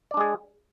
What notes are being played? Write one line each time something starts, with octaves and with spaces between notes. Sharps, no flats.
G#3 D4 G#4 D5